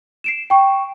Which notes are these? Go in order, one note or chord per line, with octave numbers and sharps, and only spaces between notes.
C7 D7 E7
G5 C#6